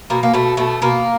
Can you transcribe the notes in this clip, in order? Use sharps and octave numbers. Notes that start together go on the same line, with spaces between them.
B2 A#3
A#3
B2 A3
B2 A3
B2 A#3